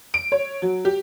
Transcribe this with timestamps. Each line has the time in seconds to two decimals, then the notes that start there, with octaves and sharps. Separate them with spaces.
0.14 D7
0.32 C#5
0.62 F#3
0.85 G4